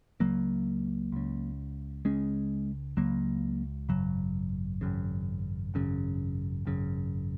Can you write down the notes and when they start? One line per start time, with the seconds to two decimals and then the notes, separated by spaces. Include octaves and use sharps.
0.20 C#2 C#3 F#3 A#3
1.12 C#2 C#3
2.05 C#2 C#3 G#3 C#4
2.97 C#2 C#3 F#3 A#3
3.89 G#1 F#2 C#3 F#3
4.81 G#1 F#2 C#3
5.74 G#1 F#2 C#3
6.65 G#1 F#2 C#3